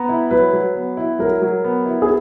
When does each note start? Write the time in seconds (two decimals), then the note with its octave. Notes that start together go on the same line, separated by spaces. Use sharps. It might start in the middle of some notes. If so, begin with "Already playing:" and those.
Already playing: B3 A#5
0.09 E4
0.31 F#3 B4
0.53 F#3
0.75 B3
0.97 E4
1.19 F#3 A#4
1.42 F#3
1.64 B3
1.86 E4
2.02 G#4